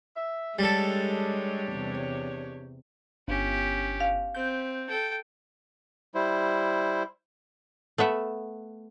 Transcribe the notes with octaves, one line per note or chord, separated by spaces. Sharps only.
E5
G3 G#3 D4 G4 A4 C#5
E2 C3
G1 C#4 G4
F5
C4 G6
A4 G5
G3 E4 C5
A3 B3 E5 F#5